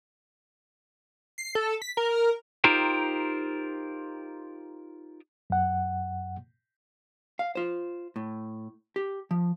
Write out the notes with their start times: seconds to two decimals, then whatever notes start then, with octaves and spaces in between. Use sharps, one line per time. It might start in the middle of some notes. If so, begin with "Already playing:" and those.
1.38 C7
1.55 A4
1.82 B6
1.97 A#4
2.64 D#4 F4 G4 A#4 C5 G5
5.50 F#2 F#5
7.39 F5
7.55 F4 C5
8.16 A2
8.96 G4
9.31 F3